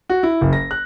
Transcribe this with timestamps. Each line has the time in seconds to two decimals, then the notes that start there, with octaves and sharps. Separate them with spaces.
0.09 F#4
0.23 E4
0.41 F#1
0.53 A#6
0.71 F#6